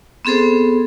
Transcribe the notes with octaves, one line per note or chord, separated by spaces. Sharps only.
B3 C4 G#4 A4 C5